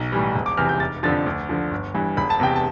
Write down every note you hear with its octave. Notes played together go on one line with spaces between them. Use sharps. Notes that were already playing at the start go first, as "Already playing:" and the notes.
Already playing: B1
A2 E3 G3
E1
D6
E2 C3 E3 F6
G6
F1 A6
F2 D3 F3 A6
D2
D3 F3
G1
G2 E3
E1 B5
A5
E2 C3 G5
A5